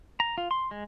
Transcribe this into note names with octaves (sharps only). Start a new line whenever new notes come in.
A#5
F4
C6
G#3